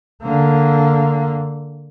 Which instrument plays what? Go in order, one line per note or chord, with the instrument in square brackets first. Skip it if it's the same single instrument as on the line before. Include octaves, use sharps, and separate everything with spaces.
[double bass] D3 A#3